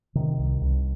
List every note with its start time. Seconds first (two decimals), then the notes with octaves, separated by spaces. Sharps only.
0.15 C3 D#3
0.39 C2
0.61 C2